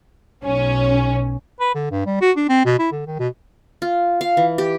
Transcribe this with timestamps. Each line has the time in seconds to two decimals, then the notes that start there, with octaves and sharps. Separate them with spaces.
0.44 B1 C#4
1.60 B4
1.75 D3
1.91 G2
2.06 G3
2.21 F#4
2.37 D4
2.49 C4
2.65 B2
2.79 E4
2.92 D3
3.07 D#3
3.19 B2
3.82 F4
4.21 F5
4.37 E3
4.58 G4